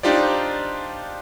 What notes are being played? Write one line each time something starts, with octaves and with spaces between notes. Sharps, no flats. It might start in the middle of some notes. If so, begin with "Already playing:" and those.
D4 D#4 F4 G4 C5 D5